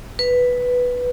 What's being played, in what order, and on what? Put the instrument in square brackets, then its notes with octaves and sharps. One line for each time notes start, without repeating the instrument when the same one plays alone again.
[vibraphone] B4